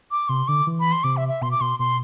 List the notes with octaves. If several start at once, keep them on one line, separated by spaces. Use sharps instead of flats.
D6
C3 C6
D3 D6
E3
B5
C6
C3 D6
E5
E5
B2 C6
D6
B2 C6
B2 C6